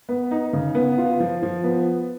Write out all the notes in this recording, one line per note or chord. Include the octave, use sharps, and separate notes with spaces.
B3
D#4
C#3
B3
F4
F3
F3
B3